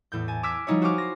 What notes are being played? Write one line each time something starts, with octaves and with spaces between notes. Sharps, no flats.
E2 A2 G6
G#5 A5
D6 E6 F6 G#6 B6 D7
F3 G3 D#4 E4 C#5
F#4 C5 G#5 C#6 D6 F6
A#6 C7